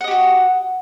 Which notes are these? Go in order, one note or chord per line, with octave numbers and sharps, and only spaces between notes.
F#4 G4 D#5 F#5